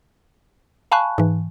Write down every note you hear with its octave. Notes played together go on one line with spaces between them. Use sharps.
F5 G#5 A5 B5 C#6 F#6
G#2 E3